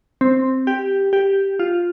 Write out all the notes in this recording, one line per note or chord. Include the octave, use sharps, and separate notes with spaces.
C4
G4
G4
F4